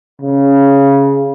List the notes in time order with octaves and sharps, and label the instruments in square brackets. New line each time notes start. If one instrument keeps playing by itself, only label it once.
[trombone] C#3